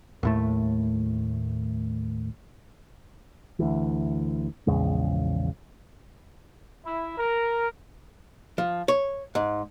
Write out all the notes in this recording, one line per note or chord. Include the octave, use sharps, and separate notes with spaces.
D#2 A2 A3
D2 E3
A#1 E2 C#3 G#3
E4
A#4
F3
C#5
G#2